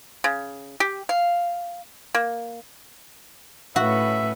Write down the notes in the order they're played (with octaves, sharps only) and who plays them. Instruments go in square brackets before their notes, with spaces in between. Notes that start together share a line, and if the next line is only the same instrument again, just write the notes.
[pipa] C#3
G4
F5
A#3
[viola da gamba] A2 C#4 B4 [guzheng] F#4 [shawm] E5